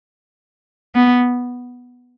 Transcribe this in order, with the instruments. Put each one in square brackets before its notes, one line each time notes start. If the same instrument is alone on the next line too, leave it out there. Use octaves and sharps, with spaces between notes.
[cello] B3